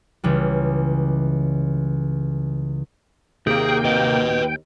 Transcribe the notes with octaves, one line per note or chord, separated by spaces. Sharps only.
C#2 C#3 E3 G3
D#2 C3 A#3 G#4 G5
B4 D#5